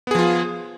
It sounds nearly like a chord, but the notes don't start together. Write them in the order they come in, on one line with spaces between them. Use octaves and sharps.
B3 G#4 F3 F4